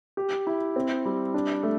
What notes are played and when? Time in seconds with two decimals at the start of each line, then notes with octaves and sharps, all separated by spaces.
0.17 G4
0.47 E4
0.76 C4
1.05 G3
1.34 D4
1.63 A3